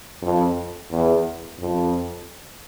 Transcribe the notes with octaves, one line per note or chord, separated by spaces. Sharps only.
F2
E2
F2